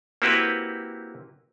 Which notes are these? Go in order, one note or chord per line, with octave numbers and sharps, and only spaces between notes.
A#3 C4 E4 F#4 G4 B4